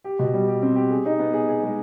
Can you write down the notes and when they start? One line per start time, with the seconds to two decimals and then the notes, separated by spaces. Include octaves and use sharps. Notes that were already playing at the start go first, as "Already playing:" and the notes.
0.04 G4
0.19 B2
0.34 G3
0.48 G4
0.62 C4
0.76 G4
0.90 G#4
1.06 D#4
1.19 B3
1.33 G#4
1.49 G#4
1.63 G#3